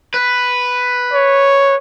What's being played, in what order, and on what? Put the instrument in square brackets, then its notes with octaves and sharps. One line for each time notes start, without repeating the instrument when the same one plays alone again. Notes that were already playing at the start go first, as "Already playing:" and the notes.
[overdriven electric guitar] B4
[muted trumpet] C#5